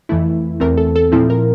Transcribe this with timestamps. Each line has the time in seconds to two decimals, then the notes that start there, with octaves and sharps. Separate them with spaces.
0.09 F2 E3 A3 E4
0.60 E2 E3 A3 C4 A#4
0.78 A4
0.96 A4
1.12 A#2 F3 C4 E4 A4
1.30 A#4